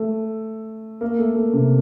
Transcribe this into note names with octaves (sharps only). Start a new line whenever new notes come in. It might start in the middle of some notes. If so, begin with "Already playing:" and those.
Already playing: A3
A#3
A3
A3
C3